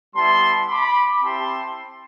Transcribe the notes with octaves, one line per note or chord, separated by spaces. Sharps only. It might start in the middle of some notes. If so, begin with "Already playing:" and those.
G3 B3 E4 A5 C6
B5 D6
C4 E4 G4 A5 C6